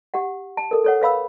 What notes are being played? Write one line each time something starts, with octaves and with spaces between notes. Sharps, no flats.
G4 F#5
A5
A4 A#4
A4 C#5 F#5
B4 F5 B5 E6